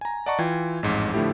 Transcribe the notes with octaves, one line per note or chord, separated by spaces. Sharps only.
G#5 A#5
D5 D#5 F#5 A5 A#5 C#6
E3 F4 G5 G#6
A1 F2 G#2
A2 D3 F3 A3 E4 G4